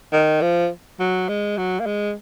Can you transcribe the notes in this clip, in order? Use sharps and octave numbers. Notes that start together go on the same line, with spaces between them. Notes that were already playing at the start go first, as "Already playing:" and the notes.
D#3
F3
F#3
G#3
F#3
A#3
G#3